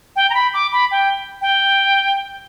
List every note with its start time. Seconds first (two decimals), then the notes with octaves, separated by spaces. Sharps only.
0.16 G5
0.30 A#5
0.34 B5
0.54 D6
0.72 B5
0.91 G5
1.41 G5